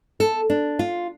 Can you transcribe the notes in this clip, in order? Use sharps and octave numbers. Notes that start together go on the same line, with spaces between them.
A4
D4
F4